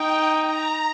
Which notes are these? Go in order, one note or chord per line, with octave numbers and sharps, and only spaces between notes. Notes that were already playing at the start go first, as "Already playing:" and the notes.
Already playing: D#4 G5
A#5